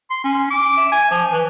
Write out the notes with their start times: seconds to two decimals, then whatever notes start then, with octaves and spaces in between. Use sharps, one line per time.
0.10 C6
0.24 C#4
0.50 D6
0.78 E5
0.92 G#5
1.11 F3
1.33 E3